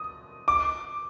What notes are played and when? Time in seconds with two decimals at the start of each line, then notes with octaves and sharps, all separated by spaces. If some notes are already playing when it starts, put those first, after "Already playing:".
Already playing: D#6
0.48 D6